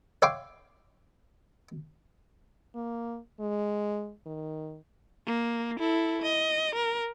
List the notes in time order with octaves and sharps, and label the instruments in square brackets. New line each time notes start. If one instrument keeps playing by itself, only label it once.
[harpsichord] C#5 E5 F5 G5 C6 D6
[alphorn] A#3
G#3
D#3
[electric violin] A#3
E4 A4
D#5
A#4